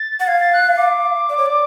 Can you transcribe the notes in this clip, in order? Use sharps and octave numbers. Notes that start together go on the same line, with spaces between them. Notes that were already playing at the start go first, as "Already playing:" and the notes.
Already playing: A6
F#5
F5 G#6
A6
F#6
D6
D5
C#5
D5